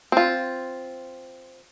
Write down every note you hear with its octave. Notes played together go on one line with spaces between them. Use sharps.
C4 F4